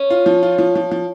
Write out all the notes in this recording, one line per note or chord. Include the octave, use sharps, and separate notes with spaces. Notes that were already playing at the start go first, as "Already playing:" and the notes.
Already playing: C#4
F4
F3
F4
F3
F3
F3